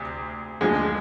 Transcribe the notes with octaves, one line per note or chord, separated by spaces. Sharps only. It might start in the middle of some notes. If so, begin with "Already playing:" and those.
Already playing: D2 C3
D2 D3 F3 G#3